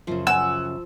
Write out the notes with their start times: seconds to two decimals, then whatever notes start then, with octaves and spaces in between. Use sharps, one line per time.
0.07 F#2 C#3 F3
0.27 F#5 G#5 E6